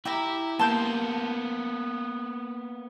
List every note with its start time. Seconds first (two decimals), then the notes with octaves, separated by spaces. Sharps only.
0.05 E4 G4 E5 A#5
0.59 A#3 B3 A5 C6 G6